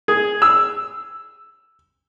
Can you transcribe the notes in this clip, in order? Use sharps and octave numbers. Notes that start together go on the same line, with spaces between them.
G#4
E6